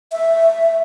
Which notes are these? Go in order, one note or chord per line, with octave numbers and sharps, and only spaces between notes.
E5